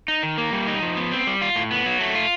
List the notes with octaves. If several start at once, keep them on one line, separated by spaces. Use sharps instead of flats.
D#4
D#3
A#3
G3
D#4
F3
B3
C4
G3
F4
A2
B3
F#3
A3
F4